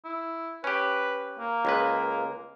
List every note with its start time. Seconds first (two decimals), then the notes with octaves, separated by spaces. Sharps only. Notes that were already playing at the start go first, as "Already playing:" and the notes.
0.05 E4
0.64 C#4 G4 B4
1.39 A#3
1.65 C#2 G#3 B4